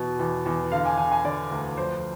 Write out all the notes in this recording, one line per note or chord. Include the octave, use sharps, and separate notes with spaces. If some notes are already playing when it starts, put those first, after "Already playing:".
Already playing: E2 B2
E2
E2
D3 F5
G#5
D3 G#5
G#5
D3 D5
D2
F2 C5